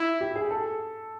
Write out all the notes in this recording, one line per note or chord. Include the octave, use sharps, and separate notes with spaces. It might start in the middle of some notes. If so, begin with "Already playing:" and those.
Already playing: E4
G4
G#4
A4